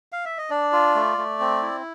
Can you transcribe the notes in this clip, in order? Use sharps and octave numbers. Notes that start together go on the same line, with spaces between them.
F5
E5
D#5
D4 D5
F4
A3
A3
C4
E4